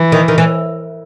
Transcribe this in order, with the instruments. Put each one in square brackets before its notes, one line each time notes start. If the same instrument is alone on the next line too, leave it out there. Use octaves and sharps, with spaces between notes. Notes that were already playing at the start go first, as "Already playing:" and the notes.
Already playing: [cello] E3
[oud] D#3
D#3
E3